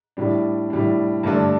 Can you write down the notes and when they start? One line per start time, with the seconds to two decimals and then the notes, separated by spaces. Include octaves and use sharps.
0.17 A2 G3 D4
0.70 A2 G3 D4
1.23 G2 D3 A3 D4 A4